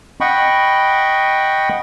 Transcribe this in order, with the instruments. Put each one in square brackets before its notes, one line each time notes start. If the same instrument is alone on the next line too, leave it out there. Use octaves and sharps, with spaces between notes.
[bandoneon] D#5 F#5 G5 B5 C#6